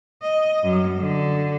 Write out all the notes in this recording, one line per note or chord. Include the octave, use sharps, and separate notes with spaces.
D#5
F#2
D3